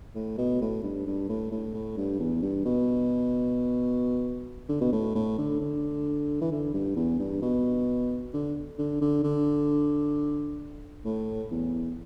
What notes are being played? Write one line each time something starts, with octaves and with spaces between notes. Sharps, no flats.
A2
B2
A2
G2
G2
A2
A2
A2
G2
E2
G2
B2
D3
B2
A2
A2
D3
D3
E3
D3
G2
E2
G2
B2
D3
D3
D3
D3
A2
E2